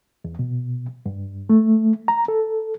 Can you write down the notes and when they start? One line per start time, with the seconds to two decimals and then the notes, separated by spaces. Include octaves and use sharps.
0.25 E2
0.39 B2
1.06 G2
1.49 A3
2.08 A#5
2.28 A4